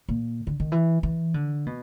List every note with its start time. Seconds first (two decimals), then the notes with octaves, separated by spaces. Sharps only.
0.09 A#2
0.47 D3
0.60 D#3
0.72 E3
1.03 E3
1.34 D3
1.66 B2